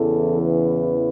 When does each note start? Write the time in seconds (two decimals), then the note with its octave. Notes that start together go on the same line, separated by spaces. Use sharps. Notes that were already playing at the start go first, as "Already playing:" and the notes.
Already playing: E2 C#3 E3 A4
0.42 B4